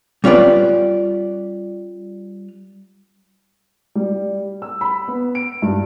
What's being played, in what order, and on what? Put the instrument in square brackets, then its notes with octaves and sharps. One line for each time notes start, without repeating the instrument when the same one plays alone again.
[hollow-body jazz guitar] G3 C#4 F4 B4 D5
[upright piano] G3
E6
B5
B3
D7
G2